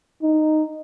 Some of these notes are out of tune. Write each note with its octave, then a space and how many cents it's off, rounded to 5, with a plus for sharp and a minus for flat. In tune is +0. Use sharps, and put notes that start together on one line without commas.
D#4 -5